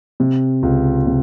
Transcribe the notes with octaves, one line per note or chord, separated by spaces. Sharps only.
C3
C#2
C3